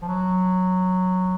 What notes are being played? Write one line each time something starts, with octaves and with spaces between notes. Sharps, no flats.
F3
F#3